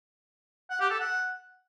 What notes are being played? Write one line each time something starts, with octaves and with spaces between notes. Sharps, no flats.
F#5
G4
A4
F#5